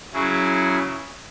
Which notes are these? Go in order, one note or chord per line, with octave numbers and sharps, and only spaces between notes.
C#3 F#3 E4 G#4